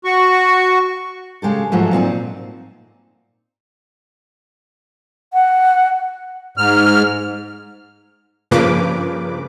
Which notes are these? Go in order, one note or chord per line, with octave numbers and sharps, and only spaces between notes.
F#4 C#6
C#3 G#3 G4 A4
G#2 C#3 F3 F#3 A3
A#2 C4 C#4 D#4
F#5
G#2 F6
G2 C#3 F3 A#3 B4 D6